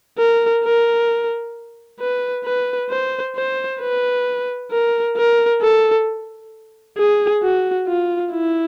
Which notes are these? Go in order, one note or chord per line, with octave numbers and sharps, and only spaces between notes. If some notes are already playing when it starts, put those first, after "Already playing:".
A#4
A#4
B4
B4
C5
C5
B4
A#4
A#4
A4
G#4
F#4
F4
E4